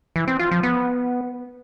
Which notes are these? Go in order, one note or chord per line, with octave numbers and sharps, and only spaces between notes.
E3
C4
F4
F3
B3